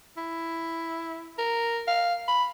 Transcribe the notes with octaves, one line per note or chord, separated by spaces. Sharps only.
E4
A#4
F5
B5